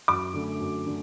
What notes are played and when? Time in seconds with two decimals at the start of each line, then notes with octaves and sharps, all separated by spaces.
0.08 F#2 D6
0.34 D3 A3
0.60 F#2
0.87 D3 A3